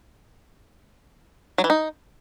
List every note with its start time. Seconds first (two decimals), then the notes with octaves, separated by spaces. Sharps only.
1.58 F#3
1.64 E3
1.70 D#4